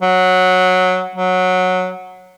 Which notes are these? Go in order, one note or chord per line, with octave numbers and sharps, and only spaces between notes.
F#3
F#3